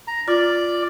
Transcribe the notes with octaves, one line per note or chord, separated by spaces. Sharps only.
A#5
F4 D5